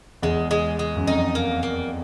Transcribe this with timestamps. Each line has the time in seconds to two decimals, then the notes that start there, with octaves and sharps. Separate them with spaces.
0.22 E2 G#3
0.51 G#3
0.79 G#3
0.96 F#2
1.07 F2 D#4
1.35 A#3
1.63 A#3